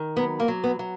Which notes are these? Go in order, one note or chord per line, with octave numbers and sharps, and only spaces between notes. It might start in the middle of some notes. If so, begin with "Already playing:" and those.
Already playing: D#3
F#3 B3
A#3
F#3
B3
F#3